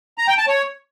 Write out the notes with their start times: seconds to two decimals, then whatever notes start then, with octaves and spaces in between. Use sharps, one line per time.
0.18 A#5
0.28 G5
0.38 A5
0.48 C#5